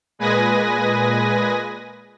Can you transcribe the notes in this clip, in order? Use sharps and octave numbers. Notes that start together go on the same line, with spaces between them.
A#2 G#3 B4 G#5 D#6 A#6